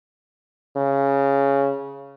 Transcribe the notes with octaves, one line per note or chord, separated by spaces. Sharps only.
C#3